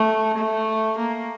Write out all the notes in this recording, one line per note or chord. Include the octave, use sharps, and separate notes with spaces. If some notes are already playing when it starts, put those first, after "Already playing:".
Already playing: A3
A3
A#3